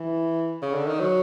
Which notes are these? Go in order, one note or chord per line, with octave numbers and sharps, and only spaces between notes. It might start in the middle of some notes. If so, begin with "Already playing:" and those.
Already playing: E3
C#3
D3
D#3
F#3